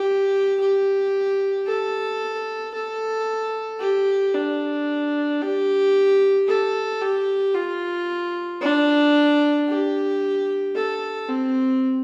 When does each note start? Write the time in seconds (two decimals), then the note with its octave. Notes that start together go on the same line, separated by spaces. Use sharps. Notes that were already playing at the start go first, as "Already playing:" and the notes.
Already playing: G4
0.60 G4
1.67 A4
2.74 A4
3.80 G4
4.34 D4
5.42 G4
6.48 A4
7.01 G4
7.55 F4
8.62 D4
9.68 G4
10.75 A4
11.29 C4